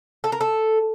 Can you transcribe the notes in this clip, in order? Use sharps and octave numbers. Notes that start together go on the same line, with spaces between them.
A4
A#4
A4